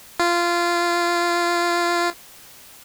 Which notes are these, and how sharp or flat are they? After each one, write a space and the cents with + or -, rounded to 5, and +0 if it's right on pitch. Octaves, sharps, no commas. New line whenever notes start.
F4 -15